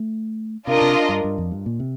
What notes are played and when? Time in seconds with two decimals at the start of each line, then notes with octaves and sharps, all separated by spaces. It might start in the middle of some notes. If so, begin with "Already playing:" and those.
Already playing: A3
0.67 C3 D4 F4 A#4 D#5
0.81 C3
1.09 G2
1.24 G2
1.38 F2
1.51 G2
1.66 A#2
1.80 C3